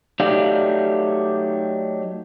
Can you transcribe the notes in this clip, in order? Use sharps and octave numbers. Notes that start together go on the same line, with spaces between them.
F#3 A3 D#4 G4 D5 F5